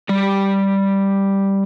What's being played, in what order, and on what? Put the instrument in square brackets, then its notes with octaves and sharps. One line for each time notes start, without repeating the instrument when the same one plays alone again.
[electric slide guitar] G3 D5